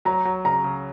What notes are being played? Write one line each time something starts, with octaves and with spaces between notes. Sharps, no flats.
F#3 A#5
F#3
C#3 A#5
C#3